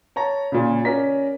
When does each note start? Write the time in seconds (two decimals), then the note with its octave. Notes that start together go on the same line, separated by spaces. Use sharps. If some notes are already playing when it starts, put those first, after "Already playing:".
0.16 C#5 A5 A#5
0.52 A#2 C#3
0.85 C#4 A#4 D5 A#5 B6